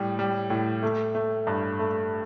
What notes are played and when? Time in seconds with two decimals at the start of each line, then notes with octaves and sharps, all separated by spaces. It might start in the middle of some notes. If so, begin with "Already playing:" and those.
Already playing: A2 G3
0.19 G3
0.50 A2
0.83 A3
1.15 A3
1.47 G2
1.79 A3